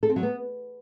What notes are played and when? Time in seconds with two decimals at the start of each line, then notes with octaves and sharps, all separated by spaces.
0.03 A4
0.09 C4
0.16 F#3
0.23 B3